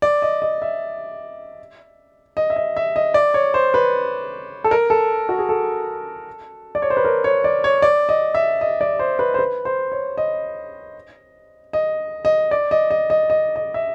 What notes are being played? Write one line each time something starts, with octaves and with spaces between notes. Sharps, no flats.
D5
D#5
D#5
E5
D#5
E5
D#5
E5
D#5
D5
C#5
C5
B4
A4
A#4
A4
F#4
G#4
A4
D5
C#5
C5
B4
A#4
C#5
D5
C#5
D5
D#5
E5
D#5
D5
C5
B4
C5
B4
C5
C#5
D#5
D#5
D#5
D5
D#5
D#5
D#5
D#5
D#5
E5